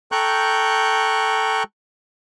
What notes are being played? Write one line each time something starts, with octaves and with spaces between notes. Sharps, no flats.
A4 G5 A#5 C#6 F#6 G6